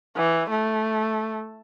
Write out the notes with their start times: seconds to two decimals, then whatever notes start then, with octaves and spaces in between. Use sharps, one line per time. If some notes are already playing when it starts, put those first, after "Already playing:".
0.16 E3
0.50 A3